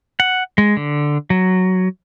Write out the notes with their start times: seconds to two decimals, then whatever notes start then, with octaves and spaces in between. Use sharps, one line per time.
0.20 F#5
0.58 G#3
0.77 D3
1.30 F#3